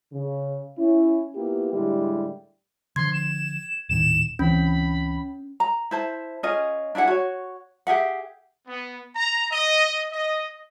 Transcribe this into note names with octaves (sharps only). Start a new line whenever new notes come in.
C#3
C#4 E4
A#3 B3 E4 F4 G4
A2 D3 G3 G#3 E4 G4
D3 F3 C6 G#6
E7
D#1 A2 D#3 E7
C#2 E3 C4 C#4 B5
A#5
E4 C5 A5
C#4 F4 G#4 D#5
D4 E4 G#4 F#5
F#4 C#5
G4 G#4 E5 F#5
B3
A#5
D#5
D#5